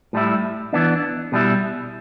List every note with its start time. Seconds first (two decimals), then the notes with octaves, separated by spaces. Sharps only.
0.13 A2 G3 E4
0.73 E3 B3 D4
1.32 B2 G3 E4